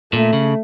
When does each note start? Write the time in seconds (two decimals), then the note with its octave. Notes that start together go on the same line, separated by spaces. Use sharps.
0.13 A#2 A3
0.33 C#3